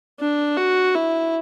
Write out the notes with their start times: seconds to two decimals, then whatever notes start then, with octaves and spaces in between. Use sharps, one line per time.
0.20 D4
0.57 F#4
0.95 E4